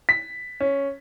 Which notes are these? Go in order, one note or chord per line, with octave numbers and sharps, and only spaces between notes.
B6
C#4